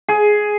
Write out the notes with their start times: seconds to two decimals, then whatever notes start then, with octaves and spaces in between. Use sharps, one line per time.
0.09 G#4